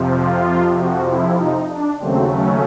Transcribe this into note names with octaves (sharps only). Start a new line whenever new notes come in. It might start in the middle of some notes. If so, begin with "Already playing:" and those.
Already playing: F2 C3 F3
F4
F#4
E4
D#4
D4
D#2 C#3 F#3 A3 C4
C#4